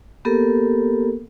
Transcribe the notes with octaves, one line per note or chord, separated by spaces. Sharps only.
A#3 B3 G4 A4 A#4